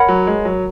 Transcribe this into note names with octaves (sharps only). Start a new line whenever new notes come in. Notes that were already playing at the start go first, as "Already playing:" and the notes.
Already playing: A#4 C#5 F#5 B5
F#3
G#3
F#3